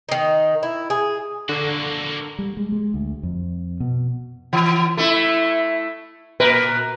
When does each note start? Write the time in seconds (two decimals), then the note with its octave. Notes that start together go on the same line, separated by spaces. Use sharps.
0.09 D#3 D#4
0.63 E4
0.90 G#4
1.49 D3 A#3 F#4
2.39 G3
2.57 G#3
2.72 G#3
2.94 D2
3.23 F2
3.80 B2
4.53 E3
4.97 A3 E4
6.40 A#2 A#4 B4